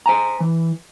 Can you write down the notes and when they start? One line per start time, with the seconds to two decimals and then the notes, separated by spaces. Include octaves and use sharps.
0.06 C5 G#5 A#5
0.40 E3